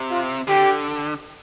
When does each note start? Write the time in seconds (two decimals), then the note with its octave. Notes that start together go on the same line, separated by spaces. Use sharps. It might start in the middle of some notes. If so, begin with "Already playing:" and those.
Already playing: C3
0.11 F4
0.47 D3 G4